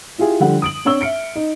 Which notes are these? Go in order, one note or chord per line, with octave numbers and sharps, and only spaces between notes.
E4 F4 G4 G#4
D3 F3 G3 F#5
D#6 D7 F#7
C4 D4 C#5 C#6 E6 G7
E5 F6 C#7 D7
D#4